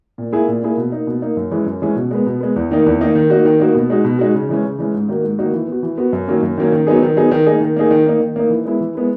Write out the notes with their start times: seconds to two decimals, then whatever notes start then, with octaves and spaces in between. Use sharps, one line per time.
0.18 A#2
0.33 A#3 E4 G#4
0.48 A#2
0.63 A#3 E4 G#4
0.77 B2
0.92 A#3 D#4
1.07 B2
1.22 A#3 D#4
1.37 F#2
1.51 E3 G#3 C#4 G#4
1.66 F#2
1.82 E3 G#3 C#4 G#4
1.96 B2
2.11 G#3 B3
2.26 B2
2.41 G#3 B3
2.56 E2
2.71 D#3 A#3 D#4
2.86 E2
3.01 D#3 A#3 D#4
3.15 D#3
3.30 A#3 D#4 F#4
3.45 D#3
3.60 A#3 D#4 F#4
3.75 B2
3.90 G#3 D#4 F#4
4.04 B2
4.19 G#3 D#4 F#4
4.34 C#3
4.49 E3 G#3 C#4
4.64 C#3
4.79 E3 G#3 C#4
4.94 G#2
5.08 D#3 A#3 D#4 F#4
5.23 G#2
5.39 D#3 A#3 D#4 F#4
5.53 E3
5.68 B3 F#4
5.83 E3
5.98 B3 F#4
6.13 F#2
6.28 D#3 F#3 A#3 C#4
6.42 F#2
6.58 D#3 F#3 A#3 C#4
6.72 D#3
6.87 F#3 B3 D#4 G#4
7.02 D#3
7.16 F#3 B3 D#4 G#4
7.31 D#3
7.46 A#3 D#4 G#4
7.61 D#3
7.76 A#3 D#4 G#4
7.91 D#3
8.06 A#3 D#4
8.21 D#3
8.36 A#3 D#4
8.50 E3
8.65 G#3 B3 E4
8.80 E3
8.95 G#3 B3 E4